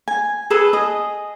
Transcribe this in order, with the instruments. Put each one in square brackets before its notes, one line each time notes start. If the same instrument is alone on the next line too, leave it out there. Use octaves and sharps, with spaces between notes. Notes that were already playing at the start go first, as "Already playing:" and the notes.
[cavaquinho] G#5
G#4 A4 B4 G#5
G#4 D#5